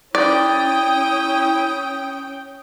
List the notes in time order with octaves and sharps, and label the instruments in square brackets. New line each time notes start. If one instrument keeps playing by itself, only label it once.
[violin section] C#4 G5 [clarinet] E4 [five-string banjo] D5 [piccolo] D#6